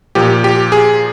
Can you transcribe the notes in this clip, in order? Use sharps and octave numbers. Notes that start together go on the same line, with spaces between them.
A#2 F3 G4
G4
G#4